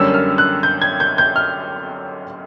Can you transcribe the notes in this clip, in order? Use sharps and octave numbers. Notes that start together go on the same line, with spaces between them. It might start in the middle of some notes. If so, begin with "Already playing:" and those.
Already playing: F#2 D3 G3 A#3 C#4 E6
F6
F#6
G6
G#6
G6
G6
F6